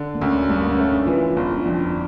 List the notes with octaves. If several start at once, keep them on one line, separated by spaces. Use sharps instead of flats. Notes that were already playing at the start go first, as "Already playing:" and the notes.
Already playing: D3
A#3
D2 C#4
G2 A#3
C#4
A3
D4
E3 F4
E4
F4
G1 E4
D4
F2
D4